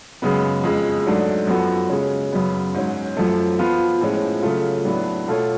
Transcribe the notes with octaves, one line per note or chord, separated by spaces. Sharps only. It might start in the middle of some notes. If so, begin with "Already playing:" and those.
F#2 C#3 G#3 B3
F2 C#3 G#3
G#2 F#3 A3 D4
F#2 F3 B3 F#4 A4
C#3 G#3 C#4
F#2 C#3 F#3 B3
G#2 F#3 C#4
F#2 F3 A3
F3 B3 F4
A2 F3 G#3 C#4
C#3 F#3 A3 F4
A2 F#3 B3 D4
B2 A3 F4 A4 C#5